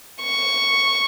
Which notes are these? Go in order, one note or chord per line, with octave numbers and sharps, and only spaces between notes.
C#6